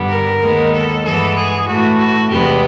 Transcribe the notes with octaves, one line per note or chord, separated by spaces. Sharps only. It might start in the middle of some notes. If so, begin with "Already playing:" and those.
Already playing: G2 D3 G3 B3
A#4
D#2 D#3 G#3 B3
A4
G2 E3 G#3 B3 A4
G#4
A2 E3 A3 F#4
F#4
E2 C3 E3 G#3 B3 G4